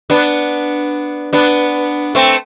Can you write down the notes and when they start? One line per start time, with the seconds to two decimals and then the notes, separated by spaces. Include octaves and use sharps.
0.10 B3 D4
1.33 B3 D4
2.15 A3 C4